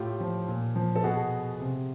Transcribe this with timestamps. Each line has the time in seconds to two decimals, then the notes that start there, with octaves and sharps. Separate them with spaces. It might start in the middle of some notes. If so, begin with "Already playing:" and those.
Already playing: A2 F4 G4
0.20 F3
0.48 A#2
0.76 F3
0.96 A4
1.04 B2 F#4 G#4
1.60 C3